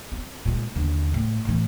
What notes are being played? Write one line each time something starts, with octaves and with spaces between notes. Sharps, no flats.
C4
A#2 G#3
D#2 D3
A2
A2 E3